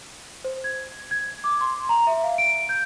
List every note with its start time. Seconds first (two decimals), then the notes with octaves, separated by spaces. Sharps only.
0.44 C5
0.64 G#6
1.11 G#6
1.44 D6
1.61 C6
1.89 A#5
2.07 E5
2.23 F5
2.38 D7
2.69 G6